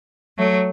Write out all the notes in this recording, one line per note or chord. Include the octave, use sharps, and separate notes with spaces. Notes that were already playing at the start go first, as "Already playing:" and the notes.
F#3 A3